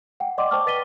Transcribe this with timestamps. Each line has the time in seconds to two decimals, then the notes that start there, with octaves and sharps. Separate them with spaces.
0.20 F#5 G5
0.38 D5 D#5 F#5 C6 D6
0.51 C5 G5 A5 C#6 D6 F6
0.66 B4 A6 B6 D#7 G7